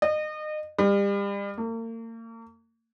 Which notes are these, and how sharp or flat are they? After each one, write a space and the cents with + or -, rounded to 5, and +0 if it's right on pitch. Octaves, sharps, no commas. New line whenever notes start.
D#5 -30
G3 +35
A#3 -40